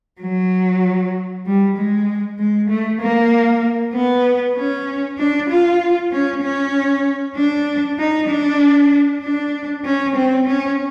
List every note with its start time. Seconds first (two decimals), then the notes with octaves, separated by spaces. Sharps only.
0.21 F#3
1.46 G3
1.76 G#3
2.39 G#3
2.70 A3
3.01 A#3
3.94 B3
4.56 C#4
5.18 D4
5.49 F4
6.12 C#4
6.42 C#4
7.36 D4
7.98 D#4
8.29 D4
9.23 D4
9.85 C#4
10.16 C4
10.47 C#4